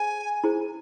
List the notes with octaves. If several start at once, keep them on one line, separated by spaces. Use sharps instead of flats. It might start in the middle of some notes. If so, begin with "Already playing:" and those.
Already playing: G#4 C5 G#5
E4 G#4 C5